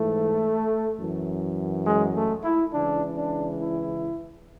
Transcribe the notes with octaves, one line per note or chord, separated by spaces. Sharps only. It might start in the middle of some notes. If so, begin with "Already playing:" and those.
Already playing: G#2 E3 A3
F#2 E3
G#3
A3
E4
C#2 C#3 E3 D4
D4
E4